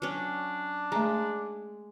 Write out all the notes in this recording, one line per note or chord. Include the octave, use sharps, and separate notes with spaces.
F#3 C#4 D4
G#3 A3 A#5